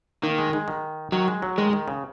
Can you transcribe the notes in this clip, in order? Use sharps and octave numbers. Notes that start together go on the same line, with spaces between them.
D#3 A#3
G#3
G#3
D#3
D#3 F#3
G#3
F#3
D#3 G#3
D#3
C#3